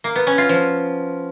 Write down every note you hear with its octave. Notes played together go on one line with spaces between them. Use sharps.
A#3
B3
C#4
F4
F3